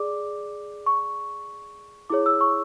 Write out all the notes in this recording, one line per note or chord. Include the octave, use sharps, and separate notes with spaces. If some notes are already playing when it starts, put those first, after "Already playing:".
Already playing: G#4 D5 D6
C#6
E4 G#4 C#5 D6
E6
C#6